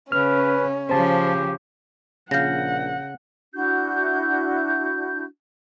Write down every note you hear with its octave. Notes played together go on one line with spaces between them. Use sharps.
C#3 C#4 B4 F6
C#3 F3 G4 C5 A5
A#1 C#3 F5 F#5 G6 A#6
D4 E4 F#4 G6